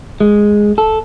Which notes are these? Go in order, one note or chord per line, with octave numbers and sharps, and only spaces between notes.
G#3
A4